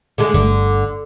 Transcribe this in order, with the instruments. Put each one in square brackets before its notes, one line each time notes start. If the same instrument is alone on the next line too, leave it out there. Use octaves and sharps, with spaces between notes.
[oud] D3 G#3
[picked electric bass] G1 [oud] D3